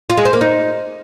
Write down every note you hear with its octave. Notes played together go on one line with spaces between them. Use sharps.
F4
G#3
C5
A#3
D#4